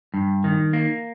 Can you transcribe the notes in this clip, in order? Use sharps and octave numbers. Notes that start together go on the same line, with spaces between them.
G2
D#3
A#3